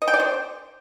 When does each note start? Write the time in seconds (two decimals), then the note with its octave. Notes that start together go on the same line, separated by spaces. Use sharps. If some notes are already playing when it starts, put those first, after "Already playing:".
0.02 D#5
0.08 G5
0.14 D5
0.20 C5